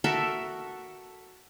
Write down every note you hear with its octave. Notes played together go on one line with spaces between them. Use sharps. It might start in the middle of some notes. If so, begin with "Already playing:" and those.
F#4 A4 A#4 E5